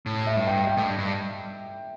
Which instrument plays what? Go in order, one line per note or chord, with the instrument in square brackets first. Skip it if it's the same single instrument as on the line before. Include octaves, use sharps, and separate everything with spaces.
[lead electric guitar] A2
[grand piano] E5
[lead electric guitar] G2
[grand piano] G5
G5
[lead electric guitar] A2
G2
G2